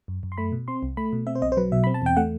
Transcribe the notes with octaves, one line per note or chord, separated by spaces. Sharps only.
F#2
F#2
C6
A3 B5
B2
C4 C6
C2
A3 B5
B2
C4 E5
C5
B1 D#5
C5
F#3 B4
B2 E5
C4 B5
A5
E2 G5
A3 F#5